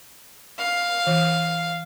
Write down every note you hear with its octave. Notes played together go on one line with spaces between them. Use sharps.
F5
E3